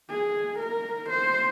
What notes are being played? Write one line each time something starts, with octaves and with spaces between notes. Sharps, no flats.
G#4
A#4
C5